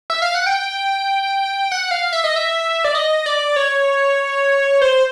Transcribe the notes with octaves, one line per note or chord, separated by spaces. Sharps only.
E5
F5
F#5
G5
F#5
F5
E5
D#5
E5
D5
D#5
D5
C#5
C5